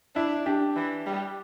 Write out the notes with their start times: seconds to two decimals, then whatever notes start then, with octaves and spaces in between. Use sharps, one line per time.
0.15 D4 E4
0.46 D4 G4
0.77 E3
1.06 G3